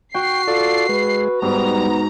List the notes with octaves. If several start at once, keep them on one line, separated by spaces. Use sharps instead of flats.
F#4 G5 C7
F4 A4 D5
G#3 B4
G#2 G3 B3 A#5